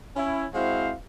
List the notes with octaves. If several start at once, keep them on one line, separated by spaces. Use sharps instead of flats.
C#4 E4
G#3 C4 E4 F#4 C5 F5